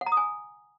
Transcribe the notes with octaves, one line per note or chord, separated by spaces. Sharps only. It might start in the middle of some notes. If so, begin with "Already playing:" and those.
F#5
A#5
D#6
G#5